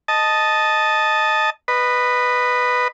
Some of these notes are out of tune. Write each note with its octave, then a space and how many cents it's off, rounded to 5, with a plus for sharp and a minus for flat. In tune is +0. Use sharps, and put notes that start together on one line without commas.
D#5 +0 A5 -10
B4 +0 D#5 -20